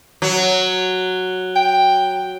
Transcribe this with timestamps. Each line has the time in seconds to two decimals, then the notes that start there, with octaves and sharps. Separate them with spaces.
0.22 F#3
1.56 G5